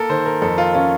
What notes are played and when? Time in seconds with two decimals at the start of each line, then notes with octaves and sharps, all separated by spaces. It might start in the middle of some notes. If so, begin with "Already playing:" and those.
Already playing: A#3 A4 A#4
0.09 D#3 C5
0.26 A#4
0.42 F2 A4
0.58 F4
0.74 C#4 F4